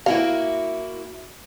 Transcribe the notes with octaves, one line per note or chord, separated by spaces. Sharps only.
A#3 E4 F#4 F5